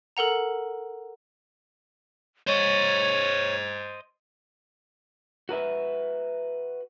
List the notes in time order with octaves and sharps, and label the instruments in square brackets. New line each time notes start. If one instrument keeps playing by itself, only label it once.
[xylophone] A4 A#4 F#5 A#5
[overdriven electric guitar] C5 D#5 [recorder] C#5
[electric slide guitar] F#4 A#4 B4 E5